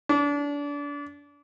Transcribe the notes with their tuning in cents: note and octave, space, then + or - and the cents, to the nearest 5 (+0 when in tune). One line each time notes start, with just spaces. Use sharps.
D4 -30